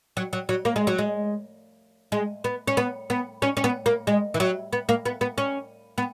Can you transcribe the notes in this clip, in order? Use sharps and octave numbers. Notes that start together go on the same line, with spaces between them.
F#3
F#3
F#3
A#3
G#3
F#3
G#3
G#3
B3
C#4
B3
B3
C#4
C#4
B3
A#3
G#3
E3
F#3
B3
A#3
B3
B3
C#4
B3